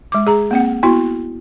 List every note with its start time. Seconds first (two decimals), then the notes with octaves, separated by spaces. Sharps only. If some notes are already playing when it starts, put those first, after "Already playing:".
0.12 G#3 D6
0.27 G#4 A#5
0.51 A#3 C4 F#5
0.83 B3 E4 F#4